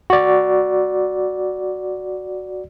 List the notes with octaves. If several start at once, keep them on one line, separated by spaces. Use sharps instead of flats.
F#4 D5